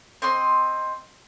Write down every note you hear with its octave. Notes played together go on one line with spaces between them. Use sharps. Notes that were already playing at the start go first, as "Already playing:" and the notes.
C4 D#5 C6